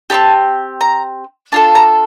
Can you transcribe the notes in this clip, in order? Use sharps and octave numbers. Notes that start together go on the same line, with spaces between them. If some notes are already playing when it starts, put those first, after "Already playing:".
C4 D#4 G4 A5
A#5
D4 F4 A4 A5
A#5